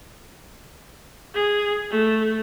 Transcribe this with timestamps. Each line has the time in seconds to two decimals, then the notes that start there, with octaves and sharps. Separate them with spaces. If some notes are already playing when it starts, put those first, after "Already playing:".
1.34 G#4
1.90 A3